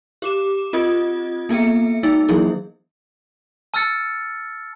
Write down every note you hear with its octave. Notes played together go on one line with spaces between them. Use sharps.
G4 D6 E7
C4 F4 D#5 D#6 G#6
A#3 B3 A4 E5 C#7
G#3 D#4 E6 A6
E3 F#3 A#3 E4 G#4
A5 E6 F6 A6 C#7